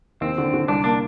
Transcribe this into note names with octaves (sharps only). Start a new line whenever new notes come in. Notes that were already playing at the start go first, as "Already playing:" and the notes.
D#2 C4
D3
D3
C2 D4
A#3 D4